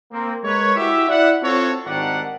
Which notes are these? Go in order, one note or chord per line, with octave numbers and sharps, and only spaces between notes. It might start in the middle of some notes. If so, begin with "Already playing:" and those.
A#3 C4
G#3 A#4 B4 C#5
E4 F#4 G4 E5
E4 D5 E5 F#5
C4 F4 F#4 A4 C#5
G#1 D#3 G3 D4 F#5